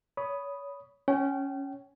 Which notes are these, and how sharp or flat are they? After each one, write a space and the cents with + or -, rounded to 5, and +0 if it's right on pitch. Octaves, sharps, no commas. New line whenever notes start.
C#5 +30 B5 +0 D#6 +0
C#4 +0 G5 -35